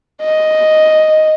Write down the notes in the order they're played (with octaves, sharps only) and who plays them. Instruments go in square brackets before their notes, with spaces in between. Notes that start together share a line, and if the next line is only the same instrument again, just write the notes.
[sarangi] D#5